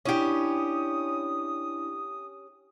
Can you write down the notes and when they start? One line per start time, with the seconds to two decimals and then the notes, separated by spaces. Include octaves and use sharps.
0.05 C#4 D4 E4 G4 E5 D#6